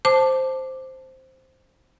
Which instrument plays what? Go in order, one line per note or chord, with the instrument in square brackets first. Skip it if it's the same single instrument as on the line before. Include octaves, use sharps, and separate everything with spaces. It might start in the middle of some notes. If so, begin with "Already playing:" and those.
[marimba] C5 A5 D6